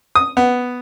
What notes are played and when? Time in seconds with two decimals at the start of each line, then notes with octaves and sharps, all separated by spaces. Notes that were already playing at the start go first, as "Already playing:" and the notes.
0.15 D#6
0.37 B3